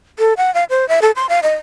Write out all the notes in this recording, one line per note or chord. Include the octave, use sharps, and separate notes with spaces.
A4
F#5
F5
C5
E5
A4
C6
F5
D#5